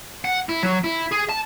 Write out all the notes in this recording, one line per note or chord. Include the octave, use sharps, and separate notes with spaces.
F#5
E4
F#3
E4
G#4
A5